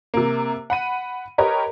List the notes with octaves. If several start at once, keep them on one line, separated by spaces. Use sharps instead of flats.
C3 A#3
F#5 B5 D#7
G4 A#4 B4 C#5 D#5